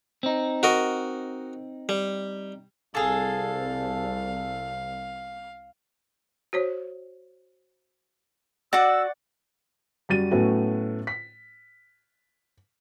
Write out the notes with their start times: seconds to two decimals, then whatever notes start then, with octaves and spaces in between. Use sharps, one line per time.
0.23 C4 D#4
0.63 F#4 A#4 D#5
1.89 G3
2.95 C2 G#4 A4 F5
6.53 F#4 C5 C#5
8.73 F#4 D5 F#5 E6
10.09 F#2 G3 F#4 A6 D#7
10.31 A2 F#3 A3 B3 C#4 F#4
11.07 B6